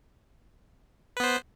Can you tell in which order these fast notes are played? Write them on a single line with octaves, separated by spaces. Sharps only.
B4 B3 C5